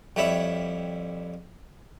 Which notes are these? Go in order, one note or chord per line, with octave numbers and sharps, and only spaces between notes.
F2 G3 E4 C#5 E5 B5